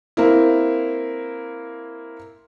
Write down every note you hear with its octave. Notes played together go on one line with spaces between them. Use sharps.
A#3 C4 E4